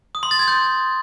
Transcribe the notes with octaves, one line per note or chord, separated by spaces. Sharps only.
D#6
C6
A6
G#6
G6